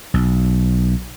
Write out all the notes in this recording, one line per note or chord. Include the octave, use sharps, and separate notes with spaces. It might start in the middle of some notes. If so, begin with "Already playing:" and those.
B1